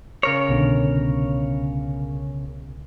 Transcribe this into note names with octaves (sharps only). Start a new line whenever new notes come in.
C#3 A#4 C#5
C2 B2 D3